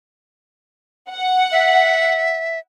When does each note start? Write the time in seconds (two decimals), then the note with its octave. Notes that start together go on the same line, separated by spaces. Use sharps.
1.11 F#5
1.52 E5